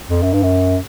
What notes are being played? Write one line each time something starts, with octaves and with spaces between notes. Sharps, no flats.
F2
F#2
G2
F#2